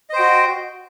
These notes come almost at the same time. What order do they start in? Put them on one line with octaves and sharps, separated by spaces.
D#5 C5 G5 F#4